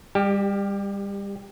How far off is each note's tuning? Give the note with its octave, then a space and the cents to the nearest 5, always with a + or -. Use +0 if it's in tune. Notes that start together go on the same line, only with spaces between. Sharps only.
G3 +30 G4 +0